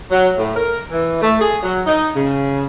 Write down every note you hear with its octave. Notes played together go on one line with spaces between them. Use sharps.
F#3
A2
A#4
E3
A3
G#4
F#3
D#4
C#3